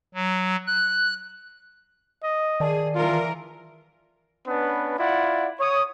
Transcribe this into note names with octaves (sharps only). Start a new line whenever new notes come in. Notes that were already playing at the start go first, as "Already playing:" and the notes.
F#3
F#6
D#5
D#3 G#4 D5 A5
E3 F4 A#4
B3 C#4 D4 B4
E4 F4 D5 F#5
C#5 D#6